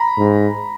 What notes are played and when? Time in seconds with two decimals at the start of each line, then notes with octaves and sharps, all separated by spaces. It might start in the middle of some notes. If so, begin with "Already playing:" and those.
Already playing: A#5 B5
0.18 G#2